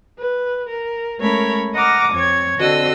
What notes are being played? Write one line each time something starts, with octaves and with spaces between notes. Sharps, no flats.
B4
A#4
G#3 A3 C#4 A#4 C#5 B5
D#5 F#5 A#5 D6 D#6 F6
F2 C4 C#5 G#6
D3 C4 F#4 D#5 E6